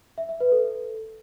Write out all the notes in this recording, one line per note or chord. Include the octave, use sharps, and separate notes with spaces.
E5
E5
B4
A4